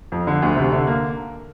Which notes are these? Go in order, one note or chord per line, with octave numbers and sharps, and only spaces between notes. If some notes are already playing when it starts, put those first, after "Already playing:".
F2
D3
D2
C3
D3
A#3